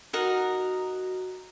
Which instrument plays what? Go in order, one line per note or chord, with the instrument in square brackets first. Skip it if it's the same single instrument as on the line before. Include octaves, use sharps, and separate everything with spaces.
[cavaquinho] D#4 A#4 F#5 [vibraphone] F#4